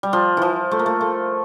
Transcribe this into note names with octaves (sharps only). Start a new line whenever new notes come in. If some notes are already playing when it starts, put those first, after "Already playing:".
G3
F3
E3 F3
A3
A#3
A3
A3